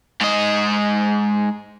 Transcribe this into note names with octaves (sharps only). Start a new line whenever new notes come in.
G#2 D#5